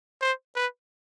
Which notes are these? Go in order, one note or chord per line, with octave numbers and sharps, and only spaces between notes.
C5
B4